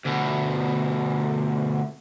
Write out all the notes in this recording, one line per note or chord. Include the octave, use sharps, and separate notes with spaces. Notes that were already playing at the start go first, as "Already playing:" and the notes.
D2 B2